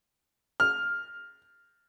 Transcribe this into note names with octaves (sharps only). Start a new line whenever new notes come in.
F6